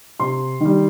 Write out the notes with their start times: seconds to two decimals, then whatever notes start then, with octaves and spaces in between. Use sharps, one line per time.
0.20 C3 C6
0.60 D#3 G3